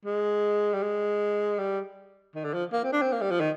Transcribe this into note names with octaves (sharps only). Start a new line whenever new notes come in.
G#3
G3
G#3
G3
D#3
D3
F3
A#3
C4
D4
C4
A#3
G3
F3
D#3